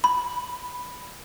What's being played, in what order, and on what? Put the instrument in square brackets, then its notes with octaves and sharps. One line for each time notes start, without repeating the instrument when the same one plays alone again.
[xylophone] B5